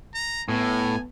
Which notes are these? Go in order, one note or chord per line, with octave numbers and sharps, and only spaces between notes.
A#5
A2 B3 G#5